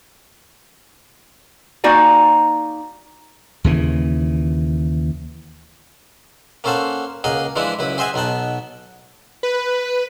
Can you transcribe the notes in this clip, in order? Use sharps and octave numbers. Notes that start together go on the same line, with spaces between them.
A#3 D#4 F#4 D5 G#5
D#2 C#3 E3
A#3 C#4 A4 C5 F#5 A5
C#2 A#3 G#4 D#5 F#5
E3 F3 G#3 D4 E4 B4
C#2 F#2 E4 B4
G#4 C5 D#5 E5 F#5 G#5
B1 B3 D#4 F#5 A5
B4